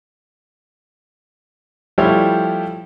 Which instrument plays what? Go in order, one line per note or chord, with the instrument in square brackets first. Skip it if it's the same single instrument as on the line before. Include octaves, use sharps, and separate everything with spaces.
[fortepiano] F3 G3 A3 E4 G4 C#5